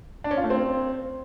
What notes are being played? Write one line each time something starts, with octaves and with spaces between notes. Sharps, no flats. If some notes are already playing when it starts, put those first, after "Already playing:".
D4
C#4
F4
A3
C4